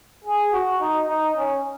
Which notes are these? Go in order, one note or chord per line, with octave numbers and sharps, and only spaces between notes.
G#4
F#4
D#4
D#4
C#4